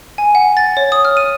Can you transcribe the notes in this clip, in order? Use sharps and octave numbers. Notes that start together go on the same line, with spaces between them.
G#5
F#5
A6
C#5
D#6
F6
D#7